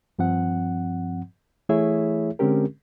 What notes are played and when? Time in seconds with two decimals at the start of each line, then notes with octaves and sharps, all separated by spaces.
0.19 G2 F3 C4 F#5
1.69 E3 A3 E4 G#4 C#5 E5
2.39 D3 G#3 C4 C#4 G4 A#4